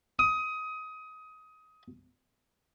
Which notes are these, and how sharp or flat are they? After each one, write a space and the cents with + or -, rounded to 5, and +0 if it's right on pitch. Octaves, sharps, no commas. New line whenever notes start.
D#6 +20